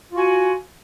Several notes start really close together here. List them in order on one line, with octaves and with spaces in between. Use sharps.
F4 F#4 G#5